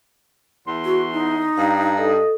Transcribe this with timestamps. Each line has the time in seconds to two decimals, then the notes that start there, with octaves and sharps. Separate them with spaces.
0.67 E2 C6
0.85 F#4
1.12 D#4
1.57 G2 F5 A#5
1.98 A4 D#5